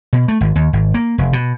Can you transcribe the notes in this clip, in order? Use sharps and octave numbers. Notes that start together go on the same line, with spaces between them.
B2
A3
G#1
D#2
G#1
A#3
F1
B2